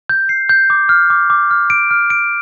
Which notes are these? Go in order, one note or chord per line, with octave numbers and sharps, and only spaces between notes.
G6
C7
G6
D6
F6
D6
D6
F6
D7
F6
D7